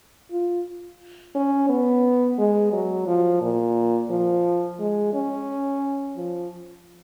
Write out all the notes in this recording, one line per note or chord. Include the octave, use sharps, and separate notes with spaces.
F4
C#4
B3
G#3
F#3
F3
A#2
F3
G#3
C#4
F3